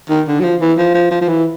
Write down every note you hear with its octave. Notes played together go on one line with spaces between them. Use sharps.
D#3
D3
F#3
F3
E3
F3
F3
F3
F3
E3